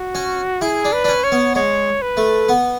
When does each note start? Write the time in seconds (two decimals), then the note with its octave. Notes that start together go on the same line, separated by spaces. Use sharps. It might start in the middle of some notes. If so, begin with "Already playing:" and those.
Already playing: F#4
0.15 C#4
0.61 E4 G#4
0.85 D4
0.93 B4
1.04 D4
1.08 C#4
1.24 C#5
1.32 B3
1.55 G#3 C#5
2.02 B4
2.17 A3
2.49 B3